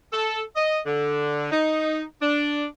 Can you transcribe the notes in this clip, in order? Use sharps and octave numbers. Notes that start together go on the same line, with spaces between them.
A4
D#5
D3
D#4
D4